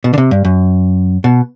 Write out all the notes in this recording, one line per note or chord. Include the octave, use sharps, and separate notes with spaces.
B2
D3
C3
G2
F#2
B2